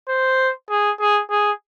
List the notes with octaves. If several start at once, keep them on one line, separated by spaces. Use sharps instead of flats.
C5
G#4
G#4
G#4